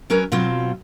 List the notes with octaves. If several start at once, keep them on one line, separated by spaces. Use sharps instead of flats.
F#3 C#4 A#4 B4 C#5
B2 F#3 C4 F4